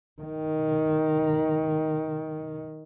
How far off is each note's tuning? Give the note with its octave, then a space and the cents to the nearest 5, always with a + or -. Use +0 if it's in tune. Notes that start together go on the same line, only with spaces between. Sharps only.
D#3 +5